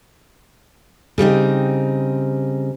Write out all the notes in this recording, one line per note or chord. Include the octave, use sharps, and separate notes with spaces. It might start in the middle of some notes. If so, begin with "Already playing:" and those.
C#3 G3 C4 D#4